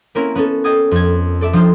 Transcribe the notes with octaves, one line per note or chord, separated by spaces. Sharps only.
A#3 C4 C#4 E4 F#4 A#4
B3 C#4 F#4 A4
D#5 G5 A5 D#6 G#6
F2 G#6
A4 D5 E5
F3 D4 D#4 F4 C5